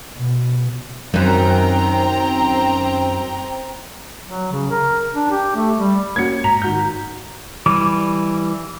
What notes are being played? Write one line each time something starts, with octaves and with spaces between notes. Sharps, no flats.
B2
F#2 D#3 F#3 C4 G5 A#5
F#3
C#3
A#4
D4
G4
A3
G3
A#3 C#4 F#4 G#6 C#7
G#2 A#5 B6 F7
D#3 F#4 G6
E3 G3 D6